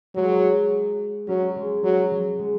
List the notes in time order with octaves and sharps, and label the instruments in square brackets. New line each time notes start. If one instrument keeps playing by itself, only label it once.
[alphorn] F#3 [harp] G#3
[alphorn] F#3 [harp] C#4
[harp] G#3
[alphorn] F#3 [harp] G#3
[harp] F#3
G#3